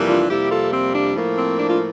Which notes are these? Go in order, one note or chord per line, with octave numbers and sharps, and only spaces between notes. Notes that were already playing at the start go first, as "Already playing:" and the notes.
Already playing: F2 C3 E3 G3 A#3
D4 F4
F2 C3 G3 A#3 E4 G4
F4 A4
C4
D4
A2 F3 A#3
C4
D4
D4 F4